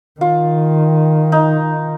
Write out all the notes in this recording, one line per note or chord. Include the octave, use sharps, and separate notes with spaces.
D#3 F4
D#4